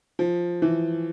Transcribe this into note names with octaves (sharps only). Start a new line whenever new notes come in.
F3
E3